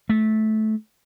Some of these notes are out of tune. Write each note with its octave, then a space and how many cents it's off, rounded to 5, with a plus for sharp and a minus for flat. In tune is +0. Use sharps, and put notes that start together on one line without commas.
A3 -15